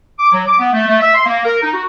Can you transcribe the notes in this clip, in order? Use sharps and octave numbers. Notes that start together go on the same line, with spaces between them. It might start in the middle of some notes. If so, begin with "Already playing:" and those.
D6
F#3
D6
B3
A3
A3
E5
C6
A#3
A#4
D#4
F#4